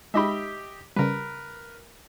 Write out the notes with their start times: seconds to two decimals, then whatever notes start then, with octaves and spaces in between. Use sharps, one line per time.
0.14 G#3 D#4 G4 D#5 E5 B5
0.96 C#3 G3 A#4 B4